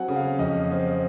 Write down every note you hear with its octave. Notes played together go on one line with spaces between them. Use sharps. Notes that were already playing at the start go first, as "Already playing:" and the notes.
Already playing: F#3 C4 F#5 G#5
C#3
F5
F2 D#5
C4